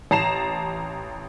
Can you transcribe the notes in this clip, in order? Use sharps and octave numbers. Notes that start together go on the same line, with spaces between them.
A1 A5 A#5 C7 E7